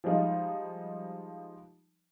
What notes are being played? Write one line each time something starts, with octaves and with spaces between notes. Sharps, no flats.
F3 G3 G#3 D#4 F4